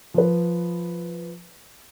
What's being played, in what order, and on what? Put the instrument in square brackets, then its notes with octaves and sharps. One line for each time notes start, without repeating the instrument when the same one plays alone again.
[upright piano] F3 B4